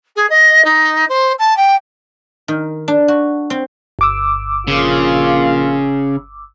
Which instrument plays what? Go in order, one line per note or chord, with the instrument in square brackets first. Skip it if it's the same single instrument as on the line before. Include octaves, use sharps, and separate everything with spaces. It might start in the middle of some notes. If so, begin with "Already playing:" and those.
[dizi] G#4
D#5
D#4
C5
A5
G5
[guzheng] D#3
D4
F#4
C4
[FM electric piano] G1 D6 E6
[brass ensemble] A#1 A#3 F4 [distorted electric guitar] C#3